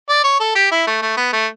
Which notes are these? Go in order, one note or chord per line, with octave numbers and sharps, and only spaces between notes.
D5
C#5
A4
G4
E4
A3
A3
B3
A3